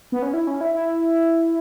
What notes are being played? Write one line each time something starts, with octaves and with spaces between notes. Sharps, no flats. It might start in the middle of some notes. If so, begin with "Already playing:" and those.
B3
C#4
E4
C#4
E4
E4